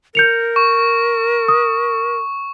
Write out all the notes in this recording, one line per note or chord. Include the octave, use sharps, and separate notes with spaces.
A#4 G6 C#7 F7
C#6
D#6